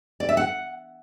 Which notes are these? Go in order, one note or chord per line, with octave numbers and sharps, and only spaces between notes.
D5
E5
F#5